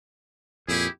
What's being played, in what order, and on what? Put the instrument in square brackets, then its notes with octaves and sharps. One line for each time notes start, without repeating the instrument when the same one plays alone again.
[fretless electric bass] F2 A#2 [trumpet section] E4 G4 G#4